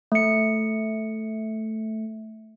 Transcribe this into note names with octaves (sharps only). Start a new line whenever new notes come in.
A3 C#7